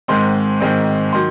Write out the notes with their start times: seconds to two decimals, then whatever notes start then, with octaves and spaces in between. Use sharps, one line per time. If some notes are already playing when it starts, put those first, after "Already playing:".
0.08 G#2 D#3 G#3 C4 C6
0.61 G#2 D#3 G#3 C4
1.13 D#3 F#3 C6